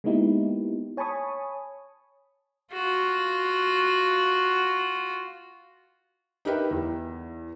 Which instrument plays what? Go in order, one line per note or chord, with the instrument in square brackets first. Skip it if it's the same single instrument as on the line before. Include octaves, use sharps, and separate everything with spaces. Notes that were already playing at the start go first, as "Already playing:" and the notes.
[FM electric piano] G#3 A#3 B3 D#4 E4 G4
C#5 G#5 A5 B5 C#6 D#6
[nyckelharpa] F4 F#4
[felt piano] D#4 G4 A#4 B4 E5 G5
E2